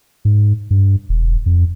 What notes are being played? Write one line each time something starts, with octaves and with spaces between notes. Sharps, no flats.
G#2
G2
E1
F2